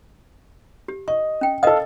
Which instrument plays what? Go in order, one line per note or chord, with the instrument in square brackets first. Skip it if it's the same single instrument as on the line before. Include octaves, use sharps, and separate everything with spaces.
[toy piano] G4
[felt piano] D#5 [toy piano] C#6
[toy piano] C#4 G5
[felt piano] A4 F5 [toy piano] A#4 D#5 D#6